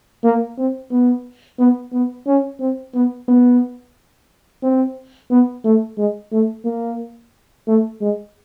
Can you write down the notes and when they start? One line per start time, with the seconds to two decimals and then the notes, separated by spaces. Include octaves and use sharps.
0.24 A#3
0.58 C4
0.91 B3
1.59 B3
1.93 B3
2.27 C#4
2.60 C4
2.94 B3
3.28 B3
4.63 C4
5.31 B3
5.64 A3
5.98 G#3
6.32 A3
6.65 A#3
7.67 A3
8.01 G#3